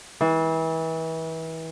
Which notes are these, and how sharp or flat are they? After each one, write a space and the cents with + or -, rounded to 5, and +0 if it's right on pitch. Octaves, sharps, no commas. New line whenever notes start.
E3 -30